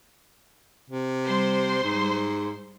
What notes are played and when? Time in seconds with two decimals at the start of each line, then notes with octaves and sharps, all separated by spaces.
0.90 C3
1.24 G3 C5 C6
1.83 G#2